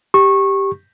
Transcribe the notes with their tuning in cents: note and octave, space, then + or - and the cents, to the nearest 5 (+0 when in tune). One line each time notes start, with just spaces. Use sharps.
G4 +0 C#6 -20